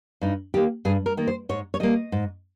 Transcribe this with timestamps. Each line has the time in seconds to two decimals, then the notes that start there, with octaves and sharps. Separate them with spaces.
0.22 G2 D#4
0.54 D#3 A#3 G4
0.85 G2 G#4
1.06 A#4
1.17 D#3 A#3
1.27 C5
1.49 G#2 C#5
1.74 C#5
1.80 G3 A#3 D#5
2.12 G#2